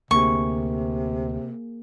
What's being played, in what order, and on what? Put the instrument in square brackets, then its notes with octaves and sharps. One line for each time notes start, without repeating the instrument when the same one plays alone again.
[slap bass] D2 [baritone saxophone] C3 [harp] A#3 G#4 [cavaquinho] C#6